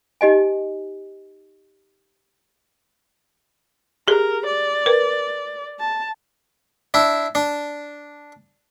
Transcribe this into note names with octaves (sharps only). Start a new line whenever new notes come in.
D#4 G4 D#5 G#5
G4 G#4 A#4
D5
A#4 B4
A5
D4 E4
D4